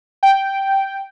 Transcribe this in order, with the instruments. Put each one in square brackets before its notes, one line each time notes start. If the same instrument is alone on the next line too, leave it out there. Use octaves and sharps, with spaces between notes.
[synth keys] G5